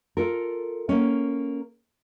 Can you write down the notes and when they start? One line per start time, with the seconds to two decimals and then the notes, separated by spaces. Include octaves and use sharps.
0.17 F4 A4 A#4
0.89 A#3 C#4